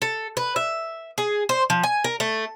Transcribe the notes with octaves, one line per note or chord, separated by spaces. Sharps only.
A4
B4
E5
G#4
C5
F3
G#5
A#4
A3